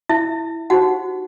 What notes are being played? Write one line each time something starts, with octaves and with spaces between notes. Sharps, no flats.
E4 E5
D#4 F#4 G4 C5 F#5